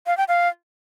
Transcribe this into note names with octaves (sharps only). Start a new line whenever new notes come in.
F5
G5
F5